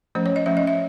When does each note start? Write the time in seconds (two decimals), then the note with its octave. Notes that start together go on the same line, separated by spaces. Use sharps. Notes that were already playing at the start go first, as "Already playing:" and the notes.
0.15 F3 A3 C#4 C5
0.26 C#5
0.36 D#5
0.46 F3 A3 C#4 E5
0.57 D#5
0.67 E5